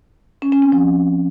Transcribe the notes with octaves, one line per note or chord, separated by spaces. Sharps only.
C#4
C#4
C4
F3